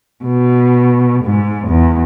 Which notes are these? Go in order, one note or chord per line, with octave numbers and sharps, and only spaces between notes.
B2
G#2
E2